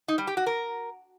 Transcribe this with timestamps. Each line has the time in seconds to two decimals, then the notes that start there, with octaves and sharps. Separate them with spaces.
0.08 D#4
0.18 G3
0.27 G4
0.37 F#4
0.46 A#4